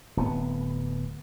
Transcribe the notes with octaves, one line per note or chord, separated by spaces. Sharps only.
D1 B3